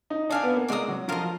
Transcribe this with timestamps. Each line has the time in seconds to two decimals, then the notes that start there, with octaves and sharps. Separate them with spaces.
0.10 D#4
0.29 D4 D5 F5 G#5
0.43 B3
0.56 A#3
0.68 G#3 D5 F5 A#5 D#6
0.88 F#3
1.08 F3 F4 A#4 D#5